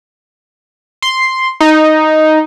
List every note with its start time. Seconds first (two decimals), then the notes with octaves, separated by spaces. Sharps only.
1.02 C6
1.60 D#4